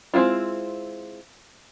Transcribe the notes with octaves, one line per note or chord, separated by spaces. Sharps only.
G#3 C4 D4 E4 F4